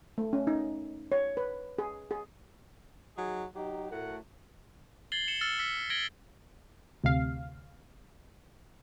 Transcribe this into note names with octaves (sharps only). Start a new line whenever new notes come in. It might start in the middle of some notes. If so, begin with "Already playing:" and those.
A3
C#4
D#4
C#5
B4
G#4
G#4
F#3 D#4 F#4 G#4
F#3 D#4 G4
A2 A3 F#4 A#4 F#5
G#6 A6 C7 F#7 G7
C#7 E7
E6 F6 A6 C#7
E6 B6 C#7
G#6 A#6 D7 F#7 G7
D2 C3 F5